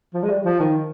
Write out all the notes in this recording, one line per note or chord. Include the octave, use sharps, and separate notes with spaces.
F3
G#3
G3
F3
D#3